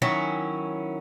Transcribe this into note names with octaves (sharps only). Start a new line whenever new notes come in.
D#3 F#3 C#4 E4